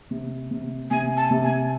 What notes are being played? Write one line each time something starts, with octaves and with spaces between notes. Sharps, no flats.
C3
C3
C3 G#5
A5
C3
G#5